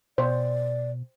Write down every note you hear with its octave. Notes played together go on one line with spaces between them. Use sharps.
B2 C5 D5